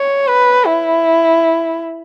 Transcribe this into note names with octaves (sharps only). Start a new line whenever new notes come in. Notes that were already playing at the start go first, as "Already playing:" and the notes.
Already playing: C#5
B4
E4